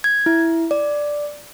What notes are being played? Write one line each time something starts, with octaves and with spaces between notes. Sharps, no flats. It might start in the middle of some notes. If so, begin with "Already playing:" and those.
G#6
E4
D5